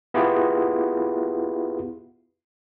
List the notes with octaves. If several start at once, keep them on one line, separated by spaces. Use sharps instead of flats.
B3 E4 F4 G4 G#4